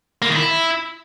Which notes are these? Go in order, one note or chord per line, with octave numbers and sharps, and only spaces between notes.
A#3
D#3
E4